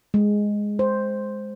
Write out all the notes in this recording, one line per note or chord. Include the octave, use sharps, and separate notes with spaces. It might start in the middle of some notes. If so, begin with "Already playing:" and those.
G#3
C5